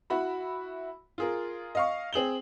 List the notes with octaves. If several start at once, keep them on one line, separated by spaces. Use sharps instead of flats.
E4 F#4 B5
F4 G#4 A#4
D#5 F5 C#6
C4 G#4 F#7 G7